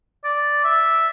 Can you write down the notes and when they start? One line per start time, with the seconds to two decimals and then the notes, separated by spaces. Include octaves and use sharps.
0.25 D5
0.64 E5